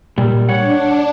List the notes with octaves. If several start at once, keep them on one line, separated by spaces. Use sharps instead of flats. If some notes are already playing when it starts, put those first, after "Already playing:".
A#2 G3
D4 C#5 F#5